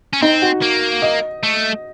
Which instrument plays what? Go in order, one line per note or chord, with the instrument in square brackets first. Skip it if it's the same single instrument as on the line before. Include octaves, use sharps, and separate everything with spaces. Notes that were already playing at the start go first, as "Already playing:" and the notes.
[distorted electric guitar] C#4
[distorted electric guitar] C4 [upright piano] D#4
[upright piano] F#4
[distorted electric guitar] A#3
[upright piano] D#5
[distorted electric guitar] A3